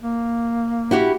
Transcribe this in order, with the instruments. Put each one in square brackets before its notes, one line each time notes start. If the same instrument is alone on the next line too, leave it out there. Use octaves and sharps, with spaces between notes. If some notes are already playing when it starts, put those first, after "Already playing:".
[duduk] A#3
[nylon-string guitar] E4 F#4 G4